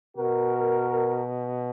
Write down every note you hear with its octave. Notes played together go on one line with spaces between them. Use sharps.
B2 F#4 A#4